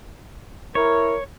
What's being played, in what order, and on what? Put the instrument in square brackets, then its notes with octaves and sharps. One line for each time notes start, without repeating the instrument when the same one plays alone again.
[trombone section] E4 A#4 [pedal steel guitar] C#5